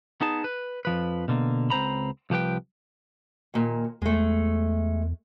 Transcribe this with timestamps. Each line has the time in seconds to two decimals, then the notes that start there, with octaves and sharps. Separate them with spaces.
0.21 B3 D#4 G#4 A5
0.44 B4
0.85 F2 F3 B4
1.28 B2 D3 A#3
1.70 C#2 C4 C5 A#5 B5
2.30 C2 F3 G4 B4 G5
3.54 D#2 A#2
4.02 E2 G#3 A3